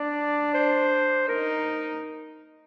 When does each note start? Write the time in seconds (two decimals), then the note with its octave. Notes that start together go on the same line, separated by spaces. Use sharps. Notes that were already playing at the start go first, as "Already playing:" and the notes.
Already playing: D4 D5
0.54 C5
1.28 D#4 A#4